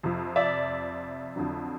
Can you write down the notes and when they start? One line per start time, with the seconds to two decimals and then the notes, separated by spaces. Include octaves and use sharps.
0.03 F2 C3 F3
0.36 D5 E5
1.36 F2 D3 F#3